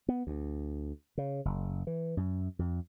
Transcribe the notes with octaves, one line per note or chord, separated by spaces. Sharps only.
B3
D2
C#3
F#1
E3
F#2
F2